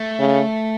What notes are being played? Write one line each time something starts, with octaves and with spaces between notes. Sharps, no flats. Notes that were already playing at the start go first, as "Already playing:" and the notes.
Already playing: A3
C#3